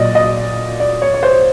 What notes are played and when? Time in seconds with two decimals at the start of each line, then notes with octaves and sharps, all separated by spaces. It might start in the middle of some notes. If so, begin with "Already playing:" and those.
Already playing: A#2 F#3 D5 D#5
0.15 D#5
0.80 D5
1.02 C#5
1.14 C#5
1.23 C5